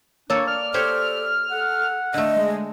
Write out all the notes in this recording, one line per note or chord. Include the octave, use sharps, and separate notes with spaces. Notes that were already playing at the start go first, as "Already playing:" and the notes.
A#3 D4 A4 C#5
D5 F6
G4 A4 C5 C#5
A4 F#5
D3 A3 D#5
G#3